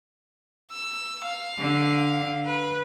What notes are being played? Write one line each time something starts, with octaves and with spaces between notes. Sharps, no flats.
E6
F5
D3
B4